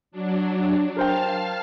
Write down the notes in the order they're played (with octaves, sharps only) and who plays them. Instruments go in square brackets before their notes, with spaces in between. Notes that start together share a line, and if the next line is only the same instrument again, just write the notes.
[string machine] F#3 D4
[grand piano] A#4 C5 G5 [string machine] F5 A5 F6